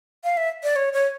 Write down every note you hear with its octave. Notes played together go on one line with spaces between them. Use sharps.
F5
E5
D5
C#5
C#5